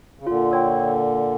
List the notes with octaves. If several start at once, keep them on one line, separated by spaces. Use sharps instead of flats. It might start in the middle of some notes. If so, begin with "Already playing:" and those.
C#3
A#2 D3 F4
A4 C#5 G5